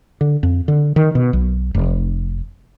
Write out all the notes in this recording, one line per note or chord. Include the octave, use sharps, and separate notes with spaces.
D3
F2
D3
D#3
B2
B1
F1